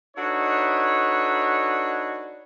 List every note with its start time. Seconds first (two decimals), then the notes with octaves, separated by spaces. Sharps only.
0.17 D4 D#4 F#4 A4 B4 C#5